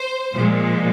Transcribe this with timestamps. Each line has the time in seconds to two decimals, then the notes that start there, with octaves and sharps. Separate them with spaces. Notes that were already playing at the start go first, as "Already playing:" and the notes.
Already playing: C5
0.33 A#2 F3 G#3